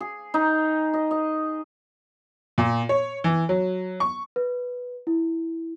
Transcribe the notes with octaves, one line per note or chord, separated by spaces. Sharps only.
G#4
D#4
D#5
D#5
A#2
C#5
E3
F#3
C#6
B4
E4